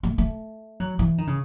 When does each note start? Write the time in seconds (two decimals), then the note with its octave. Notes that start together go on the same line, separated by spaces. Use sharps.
0.03 A3
0.18 A3
0.80 F#3
0.99 E3
1.18 D#3
1.27 C#3